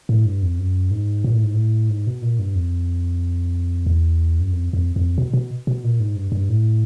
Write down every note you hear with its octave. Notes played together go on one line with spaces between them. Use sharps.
A2
G2
F2
F#2
G#2
A#2
A2
G#2
A2
G#2
B2
A#2
G2
F2
E2
F#2
F2
F2
F2
B2
B2
B2
A#2
G#2
G2
G2
A2